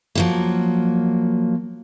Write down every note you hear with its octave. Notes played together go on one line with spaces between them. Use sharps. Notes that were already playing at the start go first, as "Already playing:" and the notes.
F3 F#3 A#3